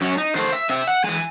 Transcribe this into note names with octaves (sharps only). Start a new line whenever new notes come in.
F#2 C#4
D#4
D#3 A3 C5
E5
C3 E5
F#5
E3 G#3 G#5